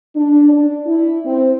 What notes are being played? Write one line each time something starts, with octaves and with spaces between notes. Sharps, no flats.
D4
D4
E4
C4